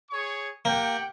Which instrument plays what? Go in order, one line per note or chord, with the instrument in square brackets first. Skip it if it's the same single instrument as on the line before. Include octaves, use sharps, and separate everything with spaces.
[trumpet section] G#4 C#5 C#6
[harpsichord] A#3 [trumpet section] G4 F#5 G5